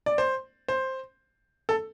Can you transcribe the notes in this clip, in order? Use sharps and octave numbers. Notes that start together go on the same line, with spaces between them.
D5
C5
C5
A4